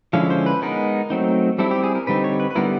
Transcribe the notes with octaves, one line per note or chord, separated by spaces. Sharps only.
D3 F3 G#3 C#4 E4 F5
C5
B4
G#3 B3 D#4 A#4
F#3 A3 C4 D#4
G3 C4 E4 A4
G4
G#4
A#4
D3 G3 C4 D#4 B4
C#5
B4
B4
D3 G3 B3 E4 A#4